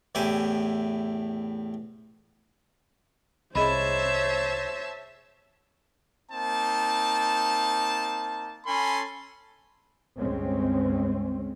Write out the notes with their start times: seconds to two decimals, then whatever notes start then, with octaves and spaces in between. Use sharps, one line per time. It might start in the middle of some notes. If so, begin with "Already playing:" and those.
0.15 E2 A2 E4 G4 G#5 D6
3.55 C2 G#4 C5 C#5 D#5 E5 A5 B5
6.32 A#3 C4 D#4 A5
8.66 C#4 A4 G#5 B5 C6
10.18 G1 C#2 G#3 C4 C#4